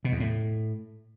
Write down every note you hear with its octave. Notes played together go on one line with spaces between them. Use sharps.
B2
E2
A2